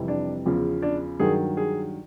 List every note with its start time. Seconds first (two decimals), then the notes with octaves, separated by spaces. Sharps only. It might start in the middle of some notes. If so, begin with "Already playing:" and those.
Already playing: F2 C3 E3 G3
0.08 D4
0.46 E2 C#3 F3
0.82 D4
1.20 G2 D#3 F#3 G#4
1.57 G#4